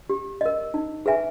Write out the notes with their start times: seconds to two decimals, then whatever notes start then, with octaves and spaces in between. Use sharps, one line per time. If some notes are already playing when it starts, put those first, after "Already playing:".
0.10 G4
0.41 A#4 D#5
0.74 D#4
1.06 G#4 B4 E5 G#5